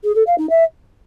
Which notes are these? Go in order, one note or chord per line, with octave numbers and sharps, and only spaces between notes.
G#4
A4
F5
D#4
E5